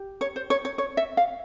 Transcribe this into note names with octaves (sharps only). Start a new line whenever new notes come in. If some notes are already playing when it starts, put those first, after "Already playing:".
Already playing: G4
C#5
C5
C#5
C#5
C#5
E5
F5